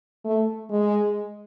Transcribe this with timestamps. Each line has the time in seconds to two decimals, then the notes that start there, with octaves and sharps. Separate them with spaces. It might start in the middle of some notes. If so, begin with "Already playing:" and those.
0.25 A3
0.70 G#3